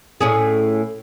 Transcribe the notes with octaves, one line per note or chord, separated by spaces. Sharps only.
A2 C#4 G#4